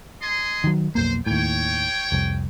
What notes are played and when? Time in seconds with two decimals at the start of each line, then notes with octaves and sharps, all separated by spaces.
0.22 D#5 G#5 C6
0.64 D#3 F#3
0.95 B1 F2 A#3 C5
1.26 D#2 A2 C#5 G5
2.12 F1 C2